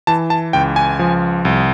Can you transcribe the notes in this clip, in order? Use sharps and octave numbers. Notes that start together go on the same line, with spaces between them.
E3 A5
A5
C#2 G5
G#5
F3
C2